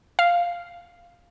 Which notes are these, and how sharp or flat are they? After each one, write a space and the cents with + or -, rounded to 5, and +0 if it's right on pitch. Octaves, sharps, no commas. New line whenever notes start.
F5 +0